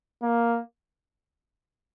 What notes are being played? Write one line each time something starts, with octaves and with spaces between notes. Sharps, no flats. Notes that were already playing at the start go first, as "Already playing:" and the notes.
A#3